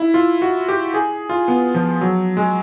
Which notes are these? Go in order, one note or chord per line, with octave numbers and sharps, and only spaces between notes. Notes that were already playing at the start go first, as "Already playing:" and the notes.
Already playing: E4
F4
F#4
G4
G#4
F4
B3
F3
F#3
G#3